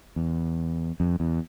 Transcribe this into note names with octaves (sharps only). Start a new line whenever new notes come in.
E2
F2
E2